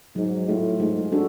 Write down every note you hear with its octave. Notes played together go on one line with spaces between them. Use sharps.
G#2 F#3
A2 A3 F4
G#2 G#3
D4 F#4 A4